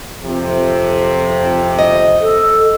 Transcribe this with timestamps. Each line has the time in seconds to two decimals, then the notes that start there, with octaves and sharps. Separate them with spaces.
0.24 F2 C3
1.79 D#5
2.21 A4